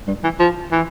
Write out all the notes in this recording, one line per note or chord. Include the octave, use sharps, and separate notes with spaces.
G2
E3
F3
E3